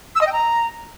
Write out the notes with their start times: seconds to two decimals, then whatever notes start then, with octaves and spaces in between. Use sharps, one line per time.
0.16 E6
0.21 D#5
0.27 G5
0.32 A#5